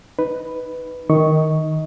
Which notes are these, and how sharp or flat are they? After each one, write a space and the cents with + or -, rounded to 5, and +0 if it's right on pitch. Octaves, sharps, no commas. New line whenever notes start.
D#4 +0 B4 +5
D#3 +0 D#5 +20 C#6 +0